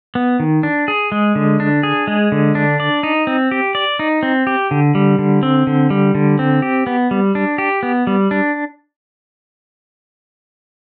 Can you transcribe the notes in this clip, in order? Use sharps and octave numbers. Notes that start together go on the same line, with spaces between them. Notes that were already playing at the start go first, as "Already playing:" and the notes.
B3
D#3
D4
G#4
G#3
D3
D4
G#4
G#3
D3
D4
D5
D#4
C4
G4
D5
D#4
C4
G4
D3
G3
D3
C4
D3
G3
D3
C4
G4
B3
G3
D4
G4
B3
G3
D4